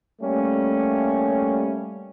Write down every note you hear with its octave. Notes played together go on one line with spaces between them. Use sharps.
G3 A3 A#3 C#4